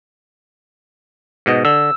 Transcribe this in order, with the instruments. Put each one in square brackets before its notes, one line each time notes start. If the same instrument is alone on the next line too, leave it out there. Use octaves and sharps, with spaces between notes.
[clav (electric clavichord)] G#2 B2 D#5
[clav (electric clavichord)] D3 [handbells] E6